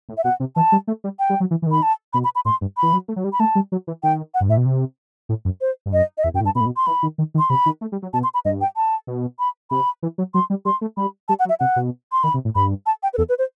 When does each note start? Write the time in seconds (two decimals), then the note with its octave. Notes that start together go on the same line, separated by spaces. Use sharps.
0.09 A2
0.17 E5
0.24 B2 F#5
0.40 C3
0.56 E3 A5
0.72 G3
0.87 A3
1.04 G3
1.19 G5
1.30 G3
1.40 F#3
1.51 E3
1.62 E3
1.66 D#3 B5
1.83 A5
2.13 B2 B5
2.24 B5
2.35 B5
2.45 A2 C6
2.61 G2
2.77 B5
2.82 E3
2.93 F#3
3.08 A3
3.16 F#3
3.24 G3
3.33 B5
3.40 A3 A5
3.55 G3
3.72 F#3
3.87 E3
4.03 D#3 G5
4.34 F#5
4.41 G2
4.49 A2 E5
4.57 B2
4.66 C3
5.29 A2
5.45 F#2
5.61 C5
5.86 G2
5.92 F#2 D#5
6.18 D#5
6.24 E2 E5
6.34 F#2 G5
6.40 A2
6.45 G2 A5
6.55 B2 B5
6.60 A2
6.66 B2
6.77 C6
6.86 E3 B5
7.03 D#3
7.18 D#3
7.35 D#3
7.39 C6
7.50 C3 B5
7.66 D#3
7.81 A3
7.92 G3
8.02 F#3
8.13 B2 A5
8.23 C6
8.34 B5
8.45 G2 D#5
8.61 G5
8.76 A5
9.07 B2
9.39 B5
9.71 C3 B5
10.03 E3
10.18 F#3
10.34 F#3 C6
10.50 G3
10.65 G3 C6
10.81 A3
10.97 G3 B5
11.29 G3 A5
11.39 F#5
11.45 F#3
11.49 E5
11.60 C3 F#5
11.76 B2
12.12 C6
12.23 D#3 B5
12.34 C3
12.45 A2
12.55 G2 B5
12.86 A5
13.03 G5
13.14 B4
13.18 E2 A4
13.29 B4
13.38 C5